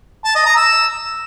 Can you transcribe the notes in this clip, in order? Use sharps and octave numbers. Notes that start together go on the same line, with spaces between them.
A5
D#5
A#5
E6